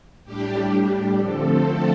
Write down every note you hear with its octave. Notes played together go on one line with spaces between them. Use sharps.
A2 G3 D4 G4
D3 F3 A3 C4 A4